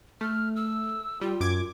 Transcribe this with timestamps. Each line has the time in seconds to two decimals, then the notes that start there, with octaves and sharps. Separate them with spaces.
0.21 A3 F6
0.56 E6
1.21 G3 F4
1.40 F#2 D6 G#6